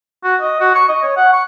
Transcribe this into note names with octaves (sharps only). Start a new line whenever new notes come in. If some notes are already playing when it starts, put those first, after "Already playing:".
F#4
D#5
F#4
C#6
D#5
C#5
F#5
C#6